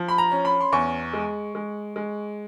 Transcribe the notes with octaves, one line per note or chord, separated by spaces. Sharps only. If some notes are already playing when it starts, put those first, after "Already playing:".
Already playing: F3
B5
A#5
C#4
B5
C6
E2 C#6
G#3
G#3
G#3